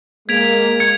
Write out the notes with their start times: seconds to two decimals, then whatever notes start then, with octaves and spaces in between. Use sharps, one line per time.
0.28 G#3 A#3 G#6 B6 D7 F7
0.80 G#6 C#7